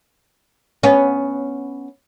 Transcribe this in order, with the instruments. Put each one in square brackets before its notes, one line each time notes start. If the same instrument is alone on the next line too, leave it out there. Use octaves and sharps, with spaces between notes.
[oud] B3 C#4